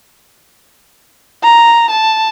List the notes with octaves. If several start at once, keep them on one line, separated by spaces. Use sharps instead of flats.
A#5
A5